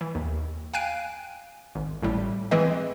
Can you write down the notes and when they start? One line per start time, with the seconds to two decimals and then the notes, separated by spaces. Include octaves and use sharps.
0.01 E3
0.15 D#2
0.74 F5 G5 G#5 F#6 D7 D#7
1.75 G#1
2.02 A1 A2 G3
2.51 E3 G#3 C4 G#4 B4 D#5